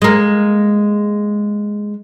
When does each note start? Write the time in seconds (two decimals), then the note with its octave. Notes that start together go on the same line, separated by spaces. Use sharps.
0.02 G#3 A#3